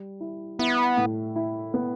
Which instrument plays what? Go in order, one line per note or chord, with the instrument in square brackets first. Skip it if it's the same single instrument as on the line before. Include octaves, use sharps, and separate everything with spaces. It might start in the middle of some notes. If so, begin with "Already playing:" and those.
Already playing: [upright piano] G3
E4
[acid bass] B3 [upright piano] E4
[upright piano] A2
E4
B3